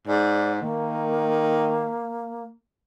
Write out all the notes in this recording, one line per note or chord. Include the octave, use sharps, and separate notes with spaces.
G#2 D5
D#3 A#3